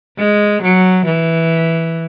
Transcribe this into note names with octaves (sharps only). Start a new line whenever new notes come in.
G#3
F#3
E3